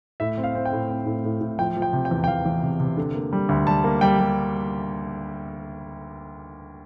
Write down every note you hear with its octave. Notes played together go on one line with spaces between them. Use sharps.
A2 E5
C4
F5
C4
G5
A2
C4
A2
A2
A2
F3 G5
F3
G5
C3
G5
E2
G5
E2 F5
E2
C3
C3
D3
A#3
G3
D2
G3 A5
A#3
G3 G5
G3